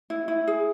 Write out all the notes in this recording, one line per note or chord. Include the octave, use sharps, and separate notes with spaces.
E4
E4
G#4